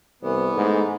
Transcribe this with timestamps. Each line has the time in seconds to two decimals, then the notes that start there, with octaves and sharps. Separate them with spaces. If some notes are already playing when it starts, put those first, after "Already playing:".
0.23 C2 E3 B3
0.57 G#2 A3